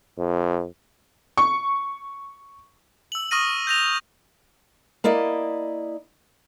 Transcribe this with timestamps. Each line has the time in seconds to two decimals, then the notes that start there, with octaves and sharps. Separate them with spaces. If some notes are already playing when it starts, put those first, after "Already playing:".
0.18 F2
1.37 C#6
3.12 E6 F#7
3.31 C#6 D#6 F6 A#6 D#7
3.67 G6 A#6 F7
5.04 A#3 E4 D5 D#5